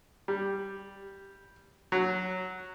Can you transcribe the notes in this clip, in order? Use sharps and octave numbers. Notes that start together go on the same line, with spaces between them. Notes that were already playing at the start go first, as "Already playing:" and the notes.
G3
F#3